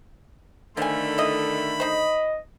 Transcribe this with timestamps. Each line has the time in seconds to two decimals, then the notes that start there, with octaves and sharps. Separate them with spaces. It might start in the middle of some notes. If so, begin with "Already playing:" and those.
0.77 D3 D#3 F3 A3 G#5 B5
1.18 E4 D#5
1.80 D#4 C5 D#5